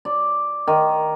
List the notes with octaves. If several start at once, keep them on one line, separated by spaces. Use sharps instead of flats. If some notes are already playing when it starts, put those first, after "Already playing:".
D5
D#3